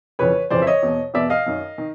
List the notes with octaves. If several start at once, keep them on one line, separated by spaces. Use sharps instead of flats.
F2 C#3 E3 B4 C#5
F2 C#3 E3 C5 D5
E5
C#5 D#5
E2 B2
E2 B2 D5 E5
D#5 F5
F#2 D#3
D#3